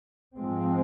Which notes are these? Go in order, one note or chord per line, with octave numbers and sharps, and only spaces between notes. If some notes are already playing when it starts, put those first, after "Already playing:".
G#2 F3 G#3 C4